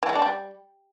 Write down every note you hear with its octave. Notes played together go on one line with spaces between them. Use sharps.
E3
G#3
D4
G3